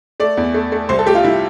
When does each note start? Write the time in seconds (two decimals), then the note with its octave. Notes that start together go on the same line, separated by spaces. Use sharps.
0.20 A3 D5
0.37 E2
0.54 A3
0.72 A3
0.89 C2 C5
0.99 A4
1.06 A3 G4
1.15 F4
1.24 C2 E4